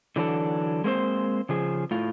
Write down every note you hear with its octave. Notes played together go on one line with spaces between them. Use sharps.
D3 E3 F#3 D4 A4
G#3 A#3 C4 C5
C#3 F3 G#4
A2 F4